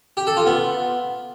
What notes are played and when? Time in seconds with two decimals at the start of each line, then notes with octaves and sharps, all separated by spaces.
0.17 G4
0.27 A4
0.37 F4
0.46 B3